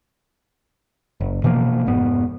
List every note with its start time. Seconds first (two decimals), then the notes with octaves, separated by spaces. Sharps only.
1.21 F#1
1.44 B2 E3 F3 A#3
1.86 F1 G#2 B3